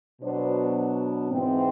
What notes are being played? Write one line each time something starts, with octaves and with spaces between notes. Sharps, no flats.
B2 F#3 B3 D4 C5 D5
G#2 E3 G#3 C4